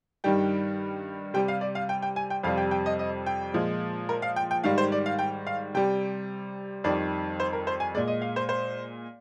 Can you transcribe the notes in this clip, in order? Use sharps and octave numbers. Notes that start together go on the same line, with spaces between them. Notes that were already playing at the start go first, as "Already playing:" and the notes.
G2 D#3 G3 G5
C3 G3 G5
F5
D5
F5
G5
G5
G#5
G5
F2 C3 G3 F5
G5
G5
D#5
D#5
G5
A#2 F3 G#3
A#4
F5
G5
G5
G#2 D#3 G3 F5
C5
D5
F5
G5
F5
C3 G3 G5
F2 D#3 G3 D5
C5
A#4
C5
G#5
A#2 G#3 D5
D#5
F5
C5
C5